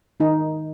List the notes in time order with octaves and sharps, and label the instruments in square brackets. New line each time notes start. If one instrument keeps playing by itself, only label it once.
[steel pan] D#3 D#4